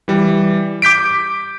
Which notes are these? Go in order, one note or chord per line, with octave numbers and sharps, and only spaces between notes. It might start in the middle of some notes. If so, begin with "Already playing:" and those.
E3 G3
D6 G6 B6 D7